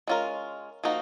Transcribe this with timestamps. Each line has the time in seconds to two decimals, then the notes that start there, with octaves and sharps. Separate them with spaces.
0.07 G#3 C#4 F4 A#4
0.84 F3 A#3 D#4 F#4